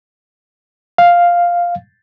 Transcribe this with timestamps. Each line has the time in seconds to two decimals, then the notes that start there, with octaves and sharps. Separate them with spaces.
0.98 F5